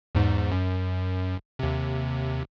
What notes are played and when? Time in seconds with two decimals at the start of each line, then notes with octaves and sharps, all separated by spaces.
0.15 E2 G#2
0.52 F#2
1.59 D#2 C3